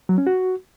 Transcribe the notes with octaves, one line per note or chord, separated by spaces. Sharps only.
F#3
C#4
F#4